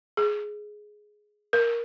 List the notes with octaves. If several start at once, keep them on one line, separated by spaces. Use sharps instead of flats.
G#4
A#4